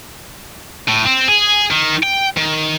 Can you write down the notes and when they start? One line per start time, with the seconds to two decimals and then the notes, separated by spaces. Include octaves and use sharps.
0.88 A2
1.06 C4
1.28 G#4
1.71 D#3
2.03 G5
2.37 D#3